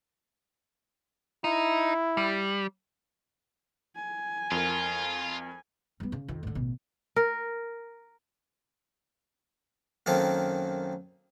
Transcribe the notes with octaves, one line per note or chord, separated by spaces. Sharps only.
D#4 E4
G3
G#5
F2 F4 A#4
G3 B3
C#3
F2 D#3
A2 D3
A1 B2
A#4
F#2 D#3 A#3 C4 A4